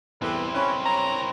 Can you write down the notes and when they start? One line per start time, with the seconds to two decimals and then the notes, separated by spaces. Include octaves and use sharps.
0.22 E2 C4 E4 G4 A4 B4
0.54 C#4 B5 C#6 F#6
0.85 G2 C#5 A#5